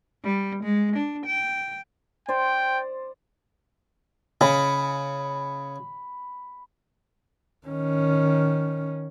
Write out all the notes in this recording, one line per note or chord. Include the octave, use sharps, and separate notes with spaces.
G3
G#3
D4
G5
C5 D5 G5
C#3 B5
D#3 C#4